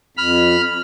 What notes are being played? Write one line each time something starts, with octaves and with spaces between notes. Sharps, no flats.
F2 B5 F6